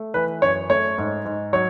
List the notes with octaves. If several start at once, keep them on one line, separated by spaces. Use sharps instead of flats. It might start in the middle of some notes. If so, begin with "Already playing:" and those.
Already playing: A3
E3 B4
F#2 C#5
A3 C#5
G#2
G#2
F#3 C#5